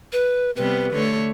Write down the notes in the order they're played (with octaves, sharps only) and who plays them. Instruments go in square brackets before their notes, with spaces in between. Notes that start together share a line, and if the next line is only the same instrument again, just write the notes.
[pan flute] B4
[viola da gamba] C3 G3 B3 [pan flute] B4
[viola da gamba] D3 A3 C#5